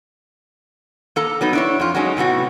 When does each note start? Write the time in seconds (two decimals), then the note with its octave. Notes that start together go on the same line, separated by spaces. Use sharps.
1.16 A#3 A4 A#5
1.41 F#3 B3 D#4
1.53 D4 E4 C#5
1.80 F2 F4
1.95 F#3 G#3 C#4 D#4
2.17 A2 C3 B3 F#4